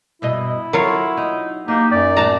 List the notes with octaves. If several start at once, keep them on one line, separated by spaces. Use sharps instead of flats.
G2 B2 E4 D#5
F#3 F4 A#4 C#5
D#4
A#3 D#4 G4
F#2 D5
A2 F#4 A5 A#5